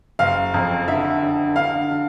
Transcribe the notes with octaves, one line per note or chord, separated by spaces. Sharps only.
F#1 F5
F2
D3 E5
D3
D3 F5
D3